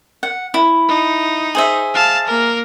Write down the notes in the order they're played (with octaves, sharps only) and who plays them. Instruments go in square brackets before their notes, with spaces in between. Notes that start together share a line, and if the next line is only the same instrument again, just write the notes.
[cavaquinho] F#5
E4
[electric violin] D#4
[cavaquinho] G#4 C5 E5
[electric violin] F5 A5
A#3 A#4